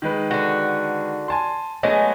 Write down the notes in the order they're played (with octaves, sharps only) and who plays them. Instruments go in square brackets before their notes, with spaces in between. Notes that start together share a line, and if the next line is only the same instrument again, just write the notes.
[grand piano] D#3 G#3 B4
[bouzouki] D3 F#4
[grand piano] G#5 A5 C6
[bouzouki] F#3 G#3 [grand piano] A3 B3 G#5